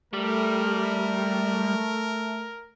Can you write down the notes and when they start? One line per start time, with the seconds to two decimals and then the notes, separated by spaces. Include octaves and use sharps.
0.13 G3 A3 A#4